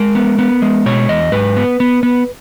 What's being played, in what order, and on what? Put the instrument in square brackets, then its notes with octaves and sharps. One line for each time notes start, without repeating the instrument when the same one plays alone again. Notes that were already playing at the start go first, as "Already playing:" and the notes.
Already playing: [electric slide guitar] G#3 A#4
B3
B3
G#3
B2 C#5
E2 D#5
G#2 B4
B3
B3
B3